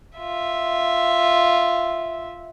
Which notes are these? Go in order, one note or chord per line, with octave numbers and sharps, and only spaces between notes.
F4 E5